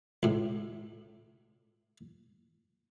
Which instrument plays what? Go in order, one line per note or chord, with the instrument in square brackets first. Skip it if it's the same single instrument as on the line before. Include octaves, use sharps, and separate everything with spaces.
[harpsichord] C#2 A2